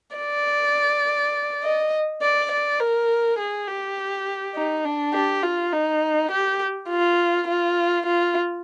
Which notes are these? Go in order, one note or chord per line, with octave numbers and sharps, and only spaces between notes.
D5
D#5
D5
D5
A#4
G#4
G4
D#4
D4
G4
F4
D#4
G4
F4
F4
F4